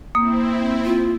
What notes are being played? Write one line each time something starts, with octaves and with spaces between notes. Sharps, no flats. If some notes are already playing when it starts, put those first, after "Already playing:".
A#3 C4 E4 D#6
F4